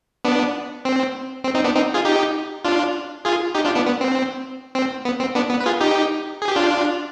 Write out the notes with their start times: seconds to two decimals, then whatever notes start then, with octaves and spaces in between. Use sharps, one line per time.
0.25 B3 D4
0.85 C4
1.44 C4
1.55 C4 D#4
1.64 B3 D4
1.75 C4 D#4
1.94 F4 G#4
2.05 D#4 G4
2.65 D4 F4
3.25 F4 G#4
3.55 D#4 G4
3.65 D4 F4
3.75 B3 D4
3.86 B3
4.01 C4
4.75 C4
5.05 B3
5.20 C4
5.35 B3 D4
5.51 B3
5.60 B4
5.66 F4 G#4
5.80 D#4 G4
6.42 G#4
6.48 G4
6.56 D4 F4